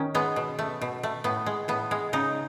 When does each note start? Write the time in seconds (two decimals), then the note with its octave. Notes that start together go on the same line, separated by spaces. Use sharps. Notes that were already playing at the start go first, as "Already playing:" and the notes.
Already playing: D#3 C#4
0.15 G#3 B3
0.36 B2
0.59 A3
0.81 B2
1.03 A3
1.24 A2 B3
1.46 G#3
1.68 A2 B3
1.91 G#3
2.13 C#3 D#4